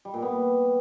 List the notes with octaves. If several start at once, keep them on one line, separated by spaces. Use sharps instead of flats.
G3
A#2
B3